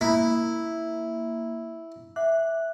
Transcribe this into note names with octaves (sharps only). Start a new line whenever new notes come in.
A#3 C#4 E4 B5 D#6
E5 F#5 D6 F#6